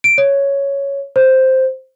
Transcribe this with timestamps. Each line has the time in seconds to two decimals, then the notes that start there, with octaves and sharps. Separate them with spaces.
0.04 D7
0.18 C#5
1.16 C5